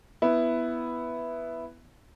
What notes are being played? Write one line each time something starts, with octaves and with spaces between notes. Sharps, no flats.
B3 E4